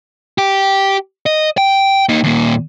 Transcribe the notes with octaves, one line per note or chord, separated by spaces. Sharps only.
G4
D#5
G5
A#3 D#4
D#2 A#2